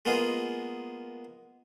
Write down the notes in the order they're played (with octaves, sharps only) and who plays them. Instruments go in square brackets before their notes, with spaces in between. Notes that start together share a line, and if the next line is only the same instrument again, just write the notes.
[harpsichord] G#3 A#3 B3 F4 G#4